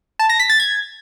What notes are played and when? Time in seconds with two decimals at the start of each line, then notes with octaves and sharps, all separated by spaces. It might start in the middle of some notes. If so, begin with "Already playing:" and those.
0.19 A5
0.29 A#6
0.40 B6
0.50 A6
0.60 G#6